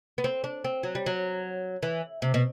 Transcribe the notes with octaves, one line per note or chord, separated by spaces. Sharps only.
B3
C4
D4
C4
F#3
G3
F#3
E3
C3
B2